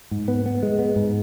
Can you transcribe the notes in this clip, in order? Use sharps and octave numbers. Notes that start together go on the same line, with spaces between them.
G#2
B3
B3
G#3
B3
G#2